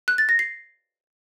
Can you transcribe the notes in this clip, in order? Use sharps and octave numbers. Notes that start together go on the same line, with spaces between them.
F#6
A6
A#6
C7